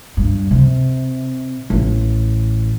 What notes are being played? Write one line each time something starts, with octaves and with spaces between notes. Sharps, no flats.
G2
C3
A1